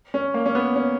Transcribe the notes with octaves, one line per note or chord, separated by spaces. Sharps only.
C#4
A#3
C#4
B3
C#4